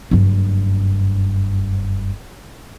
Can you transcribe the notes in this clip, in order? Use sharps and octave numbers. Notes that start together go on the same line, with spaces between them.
F#1 G2